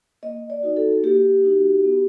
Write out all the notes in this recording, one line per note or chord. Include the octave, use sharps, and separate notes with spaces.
A#3 D#5
D5
D#4 F#4
A4
A#3 G4
D#4 F#4
B3